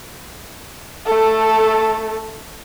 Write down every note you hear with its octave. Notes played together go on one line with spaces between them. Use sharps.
A3 A4